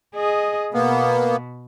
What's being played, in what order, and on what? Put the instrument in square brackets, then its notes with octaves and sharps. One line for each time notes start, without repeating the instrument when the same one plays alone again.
[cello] G#4 D#5
[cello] B2 [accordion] A#3 B3